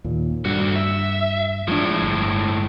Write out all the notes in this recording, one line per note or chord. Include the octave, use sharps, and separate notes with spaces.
D#2 A#2
G2 D3 F#4
E5
A2 F3 G#3 D4
G1